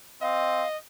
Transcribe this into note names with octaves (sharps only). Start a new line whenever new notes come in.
C4 D#5 F5